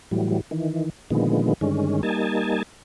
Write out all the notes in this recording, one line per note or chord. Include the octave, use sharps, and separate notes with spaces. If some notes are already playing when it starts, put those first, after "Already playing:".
A2 E3 F#3 G3
D#3 E3
A#2 D3 D#3 F3 G#3 B3
G2 D3 D#3 G#3 C#4
G3 A#3 D#4 G#5 A5